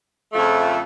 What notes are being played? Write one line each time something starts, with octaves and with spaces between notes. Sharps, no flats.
F2 C#3 F3 A3